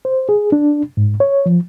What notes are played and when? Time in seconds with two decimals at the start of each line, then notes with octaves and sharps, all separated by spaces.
0.05 C5
0.29 G#4
0.52 D4
0.97 G#2
1.20 C#5
1.46 F3